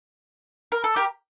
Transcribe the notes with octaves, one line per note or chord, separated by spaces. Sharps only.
A#4
A4
G4 A#4